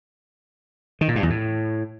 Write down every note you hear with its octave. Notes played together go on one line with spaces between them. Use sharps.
D#3
A#2
G2
E2
A2